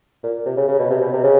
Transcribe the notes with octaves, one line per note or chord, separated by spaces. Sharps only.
A#2
C3
C#3
C#3
B2
C3
B2
C3
C#3